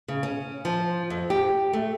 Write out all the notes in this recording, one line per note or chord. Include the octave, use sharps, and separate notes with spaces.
C#3
C#4
F3
F2
G4
A3